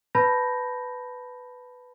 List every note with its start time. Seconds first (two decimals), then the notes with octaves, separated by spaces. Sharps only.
0.15 B4 A5 B5 G6 A#6